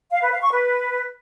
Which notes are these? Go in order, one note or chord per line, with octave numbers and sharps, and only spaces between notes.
F5
B4
F5
C#6
B4